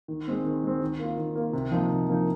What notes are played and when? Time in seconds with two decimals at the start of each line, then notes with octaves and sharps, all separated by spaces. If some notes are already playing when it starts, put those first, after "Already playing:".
0.08 D#3
0.27 G#3 C4
0.45 D#3
0.64 G#3 C4
0.81 D#3
0.99 A#3 F4
1.17 D#3
1.35 A#3 F4
1.53 C3
1.71 F3 A#3 D#4
1.89 C3
2.08 F3 A#3 D#4